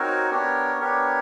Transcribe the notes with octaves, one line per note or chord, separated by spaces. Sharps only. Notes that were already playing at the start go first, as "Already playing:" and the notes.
Already playing: C4 D#4 F#4 A#4 C#5
B3 D4 G4 A#4 C#5
B3 D4 G4 A#4 C#5